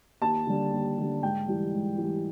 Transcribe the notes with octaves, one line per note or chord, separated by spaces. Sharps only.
D#2 A5
D3 G3
D#2
D3 G3
G#2 G5
E3 G3
G#2
E3 G3